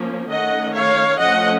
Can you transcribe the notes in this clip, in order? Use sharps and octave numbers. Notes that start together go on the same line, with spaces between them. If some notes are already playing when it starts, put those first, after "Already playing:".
Already playing: F3 A#3 C#4
D#3 A3 C#4 D#5 F#5
C#5 F5
F3 A3 C#4 D#5 F#5